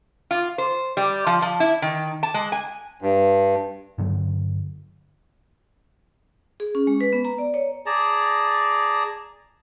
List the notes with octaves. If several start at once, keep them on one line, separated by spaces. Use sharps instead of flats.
F4
C5
G3
F3
F3
E4
D#3
A5
G#3
G#5
G2
G2 D3 F#3
G#4
C#4
G#3
B4
B3
A#5
D5
C#5
G#4 D5 A5 A#5